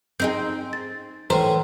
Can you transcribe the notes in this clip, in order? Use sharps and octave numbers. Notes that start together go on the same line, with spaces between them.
C4 D#4 G#4 G6
A6
A2 E3 B4 C5 A#5